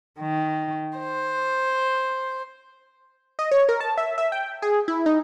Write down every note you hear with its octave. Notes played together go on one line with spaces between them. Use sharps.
D#3
C5
D#5
C#5
A#4
A5
E5
E5
G5
G#4
E4
D#4